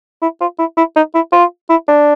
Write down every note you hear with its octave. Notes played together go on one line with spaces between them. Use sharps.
E4
F4
E4
E4
D#4
E4
F4
E4
D4